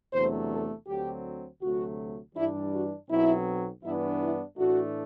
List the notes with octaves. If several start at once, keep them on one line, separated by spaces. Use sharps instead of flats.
E2 C3 F#3 A3 D4 C5
A4
D2 D3 F#3 C4 G4
D2 C3 F#3 A3 F#4
G2 E3 G3 D4 E4
F#4
B1 B2 F#3 C4 E4
G2 E3 B3 D4 E4
E4
A2 E3 A3 D4 F#4